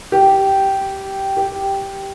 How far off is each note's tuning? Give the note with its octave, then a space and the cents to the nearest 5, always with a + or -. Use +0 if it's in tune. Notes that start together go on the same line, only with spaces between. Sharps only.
G4 -10
G4 +0